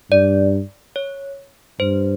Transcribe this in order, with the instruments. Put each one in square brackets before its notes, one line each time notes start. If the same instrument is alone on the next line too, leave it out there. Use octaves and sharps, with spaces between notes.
[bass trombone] G2 [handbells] D5
[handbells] C#5
[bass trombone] G2 [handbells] C5